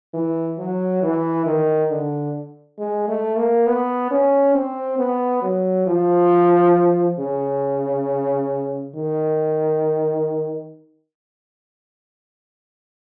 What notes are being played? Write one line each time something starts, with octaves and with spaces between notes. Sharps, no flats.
E3
F#3
E3
D#3
D3
G#3
A3
A#3
B3
C#4
C4
B3
F#3
F3
C#3
D#3